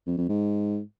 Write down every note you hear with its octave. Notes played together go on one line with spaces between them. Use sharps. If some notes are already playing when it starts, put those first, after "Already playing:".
F2
F2
G#2